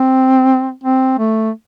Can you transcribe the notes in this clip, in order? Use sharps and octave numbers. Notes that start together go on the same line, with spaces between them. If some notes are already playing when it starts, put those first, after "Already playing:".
Already playing: C4
C4
A3